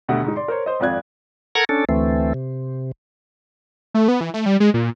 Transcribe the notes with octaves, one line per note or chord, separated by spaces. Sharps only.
D#2 B2 D3 A3 F#5
G#2 D#4
D5 C6
A#4 C5 C#5
C5 D#5
G#1 F2 F4 D5 F#6 G#6
A4 A#4 F#5 A#5 C#6 G#6
C#4 D4 A4
D2 E3 A3 C4
C3
A3
B3
E3
A3
G3
G#3
A#2